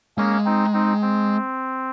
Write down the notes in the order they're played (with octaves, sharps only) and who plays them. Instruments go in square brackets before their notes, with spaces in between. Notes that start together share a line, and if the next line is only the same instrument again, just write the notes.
[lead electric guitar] G#3 [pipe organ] A#3 C#4
[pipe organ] C4 D#4
C4 D#4
C4